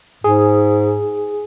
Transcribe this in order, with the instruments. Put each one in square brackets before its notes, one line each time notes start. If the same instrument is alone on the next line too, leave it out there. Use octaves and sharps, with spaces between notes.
[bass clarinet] G#2 [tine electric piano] G#4